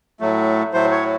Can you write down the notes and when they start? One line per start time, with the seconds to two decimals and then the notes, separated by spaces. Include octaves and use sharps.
0.20 A2 F#3 A3
0.73 A2 F#3 A3 C5
0.92 C#5